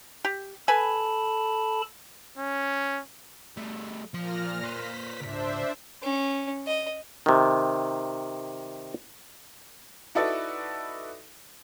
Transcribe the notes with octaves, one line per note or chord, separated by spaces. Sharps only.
G4
A4 B4 G#5 A5 B5
C#4
G3 A3
A#2 F3 C6 F6 A#6
B4 C5 B6
C#2 G#2 D4 C5 E5
C#4
D#5
C3 D#3
D#4 E4 F#4 A4 B4 D5